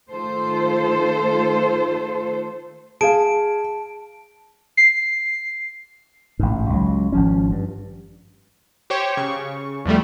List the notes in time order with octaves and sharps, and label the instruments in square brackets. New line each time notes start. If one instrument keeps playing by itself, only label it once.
[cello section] D#3 A3 F4 A4 C5
[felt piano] G#4 F5 [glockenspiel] A5 D7
[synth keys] C7
[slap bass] A1 G#2
C#2 F#3
G#1 F3 C#4
G2
[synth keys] G4 C5 C#5 G5 C#6
C#3 C#6
E2 F3 G3 A3